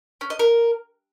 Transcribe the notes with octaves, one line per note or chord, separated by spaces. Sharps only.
C#4
D#5
A#4